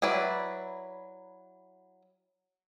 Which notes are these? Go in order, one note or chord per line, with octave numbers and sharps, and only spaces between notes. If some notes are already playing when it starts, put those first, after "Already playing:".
F#3 E4 B4 D5